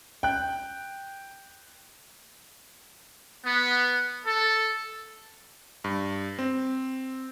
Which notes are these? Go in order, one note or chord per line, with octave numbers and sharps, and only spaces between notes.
G5 F#6
B3
A4
G2
C4